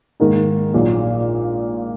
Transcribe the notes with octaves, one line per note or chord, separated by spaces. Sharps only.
G#2 D#3 A#3 D#4
A#1 A#2 F#3 A#3 D#4